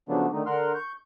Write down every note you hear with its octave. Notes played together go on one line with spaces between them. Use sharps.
C#3 F3 F#3 A3 B3 D4
D3 D#3 A3 D#4
D3 A#4 F#5 C6 F6
C#6 G6